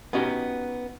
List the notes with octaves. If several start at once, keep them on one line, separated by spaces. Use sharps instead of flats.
B3 C#4 D#4 F#4 G4